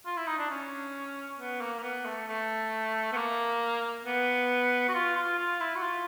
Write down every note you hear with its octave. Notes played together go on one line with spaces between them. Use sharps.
F4
E4
D#4
D4
C#4
B3
A#3
A#3
B3
A3
A3
B3
A#3
B3
F#4
F4
F4
F4
E4
F#4
F4